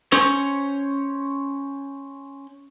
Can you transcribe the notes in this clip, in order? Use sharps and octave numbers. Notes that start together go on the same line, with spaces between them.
C#4 C5 C#5